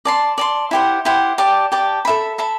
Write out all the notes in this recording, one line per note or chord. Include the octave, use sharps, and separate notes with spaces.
D5 A5 C6
D5 A5 C6
E4 G4 C5 F#5
E4 G4 C5 F#5
G4 D5 A5 D6
G4 D5 A5 D6
A4 E5 B5
A4 E5 B5